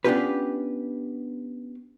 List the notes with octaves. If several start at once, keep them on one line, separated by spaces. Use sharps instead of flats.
B3 C#4 D4 F4 G4 B4